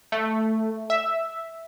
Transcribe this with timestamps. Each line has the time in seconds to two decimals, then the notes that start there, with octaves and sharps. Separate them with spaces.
0.12 A3
0.90 E5